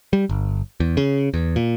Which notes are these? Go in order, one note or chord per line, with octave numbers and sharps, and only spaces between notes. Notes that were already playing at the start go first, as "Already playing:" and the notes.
G3
G1
E2
C#3
E2
A#2